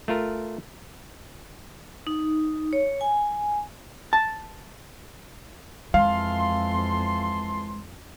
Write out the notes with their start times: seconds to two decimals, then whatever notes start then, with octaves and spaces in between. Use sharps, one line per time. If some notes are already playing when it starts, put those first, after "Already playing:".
0.08 A3 F4 A#4
2.07 D#4
2.73 C#5
3.01 G#5
4.13 A5
5.94 F2 E3 G#3 F5 A5 C6